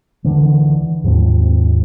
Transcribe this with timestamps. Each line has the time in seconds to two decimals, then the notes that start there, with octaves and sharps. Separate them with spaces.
0.24 C#2 D3 E3
1.04 D#2 G#2 F3 C4